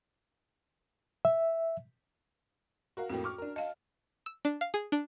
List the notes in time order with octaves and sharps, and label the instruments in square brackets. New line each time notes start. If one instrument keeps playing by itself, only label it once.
[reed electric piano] E5
[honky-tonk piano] F#4 A#4 F5
[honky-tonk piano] F2 A2 A#3 [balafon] F#4 G5
[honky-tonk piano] C#6 D6 F6
D4 A#4
[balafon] D#5 F5 [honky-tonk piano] A5
[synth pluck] E6
D4
F5
G#4
D4